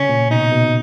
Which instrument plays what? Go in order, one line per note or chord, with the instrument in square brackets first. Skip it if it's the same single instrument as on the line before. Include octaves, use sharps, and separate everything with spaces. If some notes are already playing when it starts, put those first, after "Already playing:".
Already playing: [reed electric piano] C#3 [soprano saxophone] C#4
[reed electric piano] A#2
[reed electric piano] B2 [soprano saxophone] D#4
[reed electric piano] B2